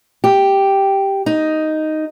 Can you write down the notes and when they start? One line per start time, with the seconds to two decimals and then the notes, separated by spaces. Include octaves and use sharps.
0.24 G4
1.26 D#4